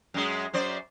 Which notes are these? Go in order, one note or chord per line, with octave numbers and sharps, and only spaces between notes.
F#2 G#3
F#2 C5 D5